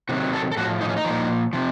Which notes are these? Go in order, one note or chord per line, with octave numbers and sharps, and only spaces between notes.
C3 D#3 F#3 F#4
A4
A4
A2 F3 F#4
D#4
C#4
D#4
A#2 F3
C3 F3